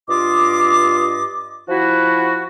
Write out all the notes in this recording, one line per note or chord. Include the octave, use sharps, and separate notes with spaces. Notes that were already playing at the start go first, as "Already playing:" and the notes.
G2 F4 D#5 D6
F3 E4 F#4